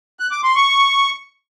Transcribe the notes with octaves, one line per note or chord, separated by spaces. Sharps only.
F#6
D6
C6
C#6